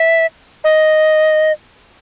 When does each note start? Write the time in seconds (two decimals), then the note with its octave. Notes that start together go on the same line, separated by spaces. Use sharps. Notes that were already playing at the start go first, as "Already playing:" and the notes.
Already playing: E5
0.64 D#5